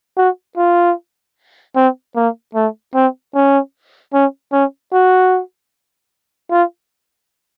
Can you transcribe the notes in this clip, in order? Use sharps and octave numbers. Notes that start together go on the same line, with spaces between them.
F#4
F4
C4
A#3
A3
C4
C#4
C#4
C#4
F#4
F4